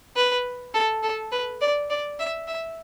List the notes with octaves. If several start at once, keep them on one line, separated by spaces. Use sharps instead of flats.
B4
A4
A4
B4
D5
D5
E5
E5